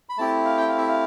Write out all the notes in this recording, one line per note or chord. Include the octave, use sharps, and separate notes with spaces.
B5
A3 C4 E4 G4 A5
F5
G5
F5
E5
F5